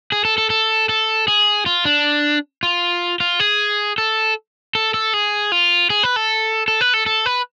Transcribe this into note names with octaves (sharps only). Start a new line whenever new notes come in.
G#4
A4
A4
A4
A4
G#4
F4
D4
F4
F4
G#4
A4
A4
A4
G#4
F4
G#4
B4
A4
A4
B4
A4
A4
B4